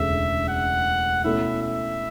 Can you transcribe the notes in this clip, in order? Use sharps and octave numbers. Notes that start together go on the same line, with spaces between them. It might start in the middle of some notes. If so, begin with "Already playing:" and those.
Already playing: E1 D2 C#3 E5
F#5
B2 A3 C#4 E4 E5
E5